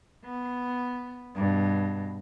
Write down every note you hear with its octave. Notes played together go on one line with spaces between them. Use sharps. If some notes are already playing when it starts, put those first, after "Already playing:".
B3
G2 B2